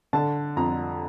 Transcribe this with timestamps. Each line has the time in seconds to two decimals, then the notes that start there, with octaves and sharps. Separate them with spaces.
0.13 D3 A5
0.56 F2 A#5